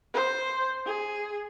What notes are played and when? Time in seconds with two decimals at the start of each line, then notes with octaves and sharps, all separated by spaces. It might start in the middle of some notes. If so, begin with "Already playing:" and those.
0.13 C5
0.85 G#4